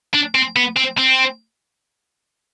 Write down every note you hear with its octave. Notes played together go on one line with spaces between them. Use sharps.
D4
C4
B3
C4
C4